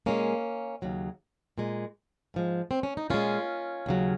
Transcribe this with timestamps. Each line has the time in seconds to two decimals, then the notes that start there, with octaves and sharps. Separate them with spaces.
0.06 A#2 G#3 A#3 C#4
0.82 D#2 C#3 F#3
1.58 A#2 G#3
2.34 G#2 F3 G#3
2.71 C4
2.83 C#4
2.97 D#4
3.10 A#2 G#3 C#4 F4
3.86 D#2 C#3 F#3